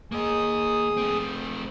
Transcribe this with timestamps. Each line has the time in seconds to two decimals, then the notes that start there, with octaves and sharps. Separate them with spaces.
0.12 A#3 G#4 D#5 D#6
0.97 A3 C4